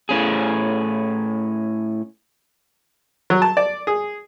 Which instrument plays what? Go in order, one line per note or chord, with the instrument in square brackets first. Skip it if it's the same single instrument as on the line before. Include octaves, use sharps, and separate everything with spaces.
[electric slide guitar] A2 C#4 G#4
[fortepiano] F#3
A5
D5
G#4